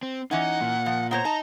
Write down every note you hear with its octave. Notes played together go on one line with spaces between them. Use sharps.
C4
E3 C#4 D#4 F#5
A#2
F3
B3 C5 C#5 A#5
D#4 A5